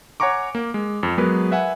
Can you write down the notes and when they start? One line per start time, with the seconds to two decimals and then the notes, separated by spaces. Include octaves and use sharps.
0.20 C#5 F#5 G#5 A#5 C#6 D6
0.55 A#3
0.74 G#3
1.03 F2
1.18 F#3 G#3 B3 G#4 A#4 B4
1.51 B4 E5 F#5 G#5